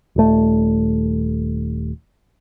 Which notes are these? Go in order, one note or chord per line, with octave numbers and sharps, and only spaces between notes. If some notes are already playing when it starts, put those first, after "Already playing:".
D#1 A3